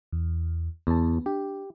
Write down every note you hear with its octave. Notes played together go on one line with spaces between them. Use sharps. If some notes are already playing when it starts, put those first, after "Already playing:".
E2
E2 B3 A5
D4 G4